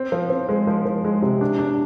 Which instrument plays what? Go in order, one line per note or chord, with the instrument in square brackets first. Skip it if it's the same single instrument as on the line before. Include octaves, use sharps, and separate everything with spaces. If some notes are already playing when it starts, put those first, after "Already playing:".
Already playing: [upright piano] C4
F3
C4
G#3
F3
F3
G#3
C3
D4
D4